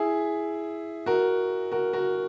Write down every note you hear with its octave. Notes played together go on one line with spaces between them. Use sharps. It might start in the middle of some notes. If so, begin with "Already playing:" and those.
Already playing: E4 G#4
F#4 A#4
F#4 A#4
F#4 A#4